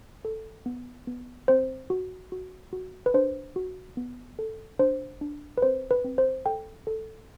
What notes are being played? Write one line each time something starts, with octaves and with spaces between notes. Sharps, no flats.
A4
B3
B3
C4 C5
F#4
F#4
F#4
B4
D4 C5
F#4
B3
A4
D4 C5
D4
B4
C4 C5
B4
C4
C5
A4 G5
A4